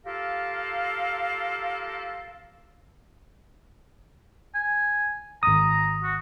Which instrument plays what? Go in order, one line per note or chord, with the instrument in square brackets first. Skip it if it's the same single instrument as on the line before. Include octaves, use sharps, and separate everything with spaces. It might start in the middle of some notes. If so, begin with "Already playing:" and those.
[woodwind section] F4 G4 A4 A#4 F5
[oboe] G#5
[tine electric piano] G#1 D#6 [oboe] A#5
[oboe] F#4